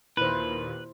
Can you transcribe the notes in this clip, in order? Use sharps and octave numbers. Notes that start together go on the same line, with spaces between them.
D#2 A#2 E4 B4 C5